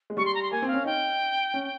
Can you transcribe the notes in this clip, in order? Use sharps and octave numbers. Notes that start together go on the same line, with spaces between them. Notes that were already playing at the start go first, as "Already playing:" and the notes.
G#3
G3 C#6
C6
A#5
C6
A#3 G#5
C4
F5
C#4
D#4 G5
C#4